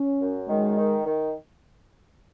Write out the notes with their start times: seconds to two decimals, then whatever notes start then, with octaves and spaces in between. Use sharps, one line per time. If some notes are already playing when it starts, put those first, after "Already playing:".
Already playing: C#4
0.21 F#2
0.48 D#3 G#3
0.78 D#3
1.06 D#3